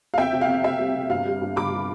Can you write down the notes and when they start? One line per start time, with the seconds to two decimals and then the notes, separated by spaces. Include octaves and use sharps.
0.14 F5
0.18 F2 E5 G5
0.33 C3
0.41 F5
0.48 F2
0.64 C3 E5
0.79 G3
0.95 C3
1.10 G2 F5
1.26 G3
1.42 G2
1.56 G2 B5 D6
1.72 G3